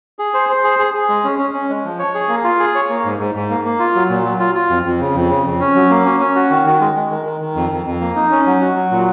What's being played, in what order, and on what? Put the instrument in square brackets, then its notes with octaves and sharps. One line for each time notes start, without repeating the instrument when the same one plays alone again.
[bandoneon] G#4
C5
C5
G#4
G#4
G#4
G#3
C#4
C#4
C#4
G#3
F3
C#5
G#4
A#3
F4
G#4
C#5
A#3
G#2
G#2
G#2
A#3
A#3
F4
F#3
A#2
F#3
F4
F4
F2
F2
C#3
F2
C#3
F2
C#4
F#3
A#3
C#4
C#4
F#4
D#3
D#3
G#3
G#3
D#3
D#3
D#3
F2
F2
F2
A#3
D#4
C#4
F#3
F#4
F#3
A#2